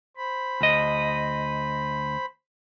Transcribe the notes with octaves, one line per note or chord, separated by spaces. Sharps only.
C5 B5
D2 D#5